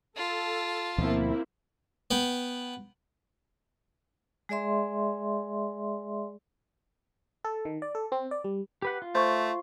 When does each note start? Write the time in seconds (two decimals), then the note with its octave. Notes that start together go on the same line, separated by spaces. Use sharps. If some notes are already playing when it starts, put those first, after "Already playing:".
0.17 F4 A4 A5
0.98 D2 B2 F3 A#3 C4 E4
2.11 B3 G5
4.49 G#3 G#4 D5 E5 C6
7.44 A4
7.65 D#3
7.82 D5
7.95 A4
8.12 C4
8.31 D5
8.44 G3
8.82 G4 B4 F#5
9.02 F4
9.15 A3 C5 C6 C#6